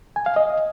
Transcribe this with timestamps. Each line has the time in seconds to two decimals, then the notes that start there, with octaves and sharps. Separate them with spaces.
0.16 G#5
0.26 F5
0.36 D#5